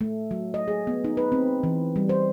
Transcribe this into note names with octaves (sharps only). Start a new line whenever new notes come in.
A3
F#3
D#5
G#4
B3
D#4
B4
C4
E3
G3
C5